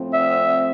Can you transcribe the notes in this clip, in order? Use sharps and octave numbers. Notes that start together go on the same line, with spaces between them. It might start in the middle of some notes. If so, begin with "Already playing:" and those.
Already playing: A2 F3 C4
E5